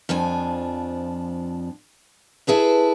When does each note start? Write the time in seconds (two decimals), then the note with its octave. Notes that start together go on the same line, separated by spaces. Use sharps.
0.09 F2 F3 D4 G#5
2.47 E4 G#4 A4 B4